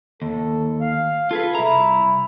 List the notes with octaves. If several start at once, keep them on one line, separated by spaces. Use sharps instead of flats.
D#2 A4
F5
F4 G#4 A4 B4
C2 E4 A#5